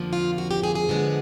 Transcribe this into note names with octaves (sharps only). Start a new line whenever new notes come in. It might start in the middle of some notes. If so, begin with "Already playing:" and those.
Already playing: F2 D3 F3 A#3
F4
F#4
G4
G#4
G#4
D3 F3 G#3 B3